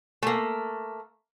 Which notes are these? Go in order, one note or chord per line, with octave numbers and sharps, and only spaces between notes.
A3 A#3